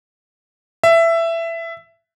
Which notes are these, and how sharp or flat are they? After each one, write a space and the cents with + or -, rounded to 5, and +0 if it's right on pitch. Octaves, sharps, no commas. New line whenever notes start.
E5 +15